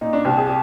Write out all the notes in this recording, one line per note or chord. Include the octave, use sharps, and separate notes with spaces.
A#2 D#4
D4
C2 G4
G#4
G4